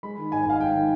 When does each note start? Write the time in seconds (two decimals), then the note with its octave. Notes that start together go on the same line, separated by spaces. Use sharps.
0.03 G#3 B5
0.18 D#3
0.32 G#2 G#5
0.46 G#1 F5
0.60 G#3 G5
0.75 D#3